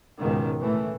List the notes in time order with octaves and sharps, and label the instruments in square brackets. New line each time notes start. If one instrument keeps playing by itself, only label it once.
[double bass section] C#2 G#2 B2 D#3
A2 E3 A3